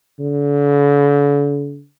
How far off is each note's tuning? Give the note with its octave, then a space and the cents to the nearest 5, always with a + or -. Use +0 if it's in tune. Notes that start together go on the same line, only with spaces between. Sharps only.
D3 -40